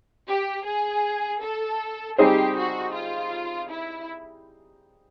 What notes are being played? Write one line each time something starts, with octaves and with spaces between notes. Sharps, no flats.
G4
G#4
A4
G3 C4 D#4 G4 G#4 C5
F#4
F4
E4